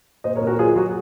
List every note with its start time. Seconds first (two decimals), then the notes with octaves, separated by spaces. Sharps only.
0.24 A#2 C5 D#5
0.35 A#4 C#5
0.41 A#2
0.47 F#4 A#4
0.58 F#3 F4 G#4
0.76 F#3 F#4